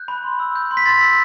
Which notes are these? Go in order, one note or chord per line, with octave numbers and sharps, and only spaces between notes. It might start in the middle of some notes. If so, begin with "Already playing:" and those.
Already playing: F#6 G6
B5
C6
E6
G6
C6
B6
C6 A6
E6